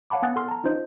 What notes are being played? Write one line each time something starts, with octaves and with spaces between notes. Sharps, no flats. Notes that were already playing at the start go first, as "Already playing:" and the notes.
C#5 F5 F#5 A5 B5 D6
B3 F#5 G#5 D#6 F#6 A6
A4 C6 F6
A5 A#5
C#4 D#4 F4 C5 D#5